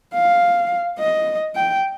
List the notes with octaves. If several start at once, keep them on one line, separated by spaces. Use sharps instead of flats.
F5
D#5
G5